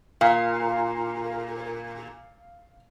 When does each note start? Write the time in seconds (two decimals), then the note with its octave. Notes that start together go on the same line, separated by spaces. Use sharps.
0.21 A#2 F5